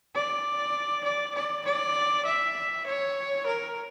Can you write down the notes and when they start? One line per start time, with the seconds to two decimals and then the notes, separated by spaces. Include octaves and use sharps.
0.15 D5
1.04 D5
1.35 D5
1.65 D5
2.26 E5
2.86 C#5
3.46 A#4